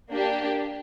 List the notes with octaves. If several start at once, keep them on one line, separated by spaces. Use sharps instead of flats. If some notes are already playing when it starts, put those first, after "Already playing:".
A#3 D4 G4